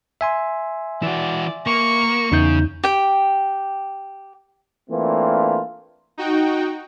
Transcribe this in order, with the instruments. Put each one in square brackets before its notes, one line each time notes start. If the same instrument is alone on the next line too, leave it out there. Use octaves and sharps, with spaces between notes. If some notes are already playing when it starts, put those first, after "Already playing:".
[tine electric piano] E5 G#5 C6
[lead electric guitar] E3 F#4 [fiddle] D5
[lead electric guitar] A#3 [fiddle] C#6
[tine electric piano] E2 D#4 G6 [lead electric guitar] C#3
[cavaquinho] G4 G5
[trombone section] E3 A3 A#3 C4 D4 F4
[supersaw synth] D#4 F#4 G5